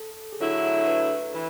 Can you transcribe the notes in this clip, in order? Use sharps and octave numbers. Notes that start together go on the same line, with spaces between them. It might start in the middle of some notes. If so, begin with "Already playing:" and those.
Already playing: A4
G#4
D3 F#3 A3 E4 A4
A4
B4
E3 B4